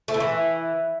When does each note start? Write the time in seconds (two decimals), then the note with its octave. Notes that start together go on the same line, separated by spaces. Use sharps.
0.08 A3
0.14 E4
0.20 E3